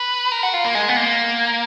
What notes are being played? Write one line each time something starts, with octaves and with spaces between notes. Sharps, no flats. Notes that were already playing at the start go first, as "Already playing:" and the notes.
Already playing: B4
A#4
F#4
F4
A#3
G#3
B3
A#3